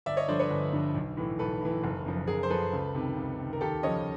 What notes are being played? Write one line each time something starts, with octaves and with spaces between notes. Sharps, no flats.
G1 D5 E5
C#5 D#5
G2 D3 F3 C5 D5
B4 C#5
G1
G2 D3 F3
B1
A2 E3
B1 A4 B4
A2 E3
F#1
F#2 C#3 F3
F#1 G#4 A#4
C5
F#2 C#3 F3 A4 B4
C#2
C3 D#3
C#2
C3 D#3
A#4
D#2 G4 A4
C#3 F3 C#5 D#5